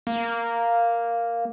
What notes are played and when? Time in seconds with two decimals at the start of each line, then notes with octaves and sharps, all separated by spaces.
0.07 A#3